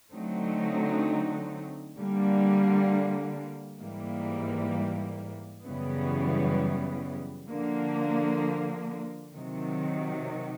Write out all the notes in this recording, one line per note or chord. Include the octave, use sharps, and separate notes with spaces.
D3 F#3 A3 C4 D#4
D3 G3 A#3
G#2 E3 G3 A#3
F#2 C#3 E3 G3 B3
D3 F3 A#3
C3 D#3 F#3